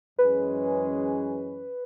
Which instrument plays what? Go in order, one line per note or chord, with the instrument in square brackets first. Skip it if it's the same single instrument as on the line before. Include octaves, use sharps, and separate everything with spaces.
[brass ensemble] F#2 E3 G#3 C#4 G#4 [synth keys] B4